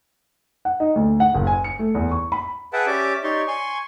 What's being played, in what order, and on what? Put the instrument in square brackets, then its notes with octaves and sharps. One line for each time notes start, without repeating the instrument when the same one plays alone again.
[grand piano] F#5
D#4
D2
F#5
F#1
G#5
C#7
A3
E2
C#6
B5
[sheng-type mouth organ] G#4 B4 E5 F#5 G5 A5
C#4 G4 D5 E5 D6
D#4 G4 C#5 D5 C6 C#6
G#5 C6 C#6